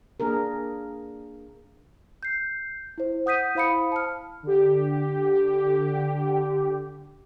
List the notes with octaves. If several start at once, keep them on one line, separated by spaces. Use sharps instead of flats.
A#3 D4 G#4 A#4
G6 C7
E4 C5
F#5 D#6 G6 B6 D#7
E4 C5 F5 B5 D#6 C#7
A5 F6
D3 G4